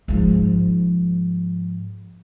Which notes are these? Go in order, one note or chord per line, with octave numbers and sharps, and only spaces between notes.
G#2 F3